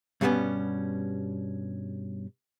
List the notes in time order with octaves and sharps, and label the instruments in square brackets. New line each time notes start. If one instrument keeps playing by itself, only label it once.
[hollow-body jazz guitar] G2 B2 G3 A3 B3 C#4